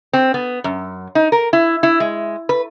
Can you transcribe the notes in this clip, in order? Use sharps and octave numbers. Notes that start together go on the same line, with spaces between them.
C4
B3
F#2
D#4
A#4
E4
E4
G#3
B4